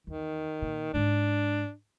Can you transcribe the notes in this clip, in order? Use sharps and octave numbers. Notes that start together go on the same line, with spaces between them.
E2 D#3
A#2
G#2 G#3 D4